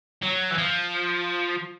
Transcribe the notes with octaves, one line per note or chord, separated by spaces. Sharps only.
F#3
E3
F3